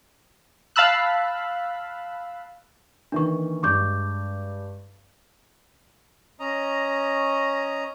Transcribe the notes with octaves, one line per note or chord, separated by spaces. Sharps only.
F5 A5 B5 E6 F#6
D#3 E3 A#3 D4 C#6
G2 G#3 C#6 D6 G6
C#4 D#5 A#5